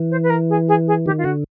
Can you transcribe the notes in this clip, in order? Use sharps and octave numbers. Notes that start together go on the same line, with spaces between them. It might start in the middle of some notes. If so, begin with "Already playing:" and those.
Already playing: E3
C5
B4
A#4
G#4
G#4
G#4
D#3 G4
F4
D3 F#4